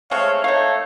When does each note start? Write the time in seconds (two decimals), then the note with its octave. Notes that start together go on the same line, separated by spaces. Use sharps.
0.11 G#3 A3 C4 C#5 F5
0.44 A3 D#4 A4 C#5 F5